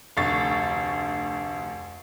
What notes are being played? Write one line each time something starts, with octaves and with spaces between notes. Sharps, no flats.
F1 D2 C#6 A6